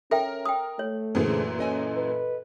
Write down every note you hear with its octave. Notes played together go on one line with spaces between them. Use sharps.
C#4 A4 A#4 E5 G5
G5 D#6
A3 C#5
F#2 A#2 D3 E3 G#4 C5
C#4 A4 D#5 G#5
B4